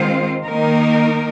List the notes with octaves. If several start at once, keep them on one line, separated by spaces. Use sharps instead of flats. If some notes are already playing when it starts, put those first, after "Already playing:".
Already playing: D#3 G#3 C4 F4 C5
D#3 A#3 D#4 A#4